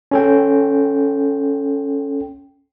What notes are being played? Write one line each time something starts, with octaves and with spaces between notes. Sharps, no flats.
C#4 A4 G5